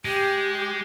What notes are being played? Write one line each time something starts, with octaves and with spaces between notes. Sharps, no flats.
G#3 G4